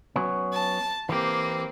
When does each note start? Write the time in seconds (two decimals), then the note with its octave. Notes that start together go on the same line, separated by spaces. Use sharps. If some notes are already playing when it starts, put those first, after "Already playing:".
0.16 F#3 B3 C#4
0.53 A5
1.09 E3 A#3 C4 G4